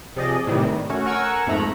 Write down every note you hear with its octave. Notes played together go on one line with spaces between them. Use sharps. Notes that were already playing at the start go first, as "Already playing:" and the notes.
C3 F3 G#4 D5 D#5
A2 C3 D#3 E3 G3
D#3
A3 C#4 F#4
A#4 F#5 G#5 C#6 E6
F2 G#2 F3 A3 A#5 B5